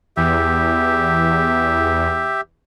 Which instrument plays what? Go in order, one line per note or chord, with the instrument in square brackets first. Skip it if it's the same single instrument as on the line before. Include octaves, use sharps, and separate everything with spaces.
[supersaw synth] E2 [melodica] G4 E5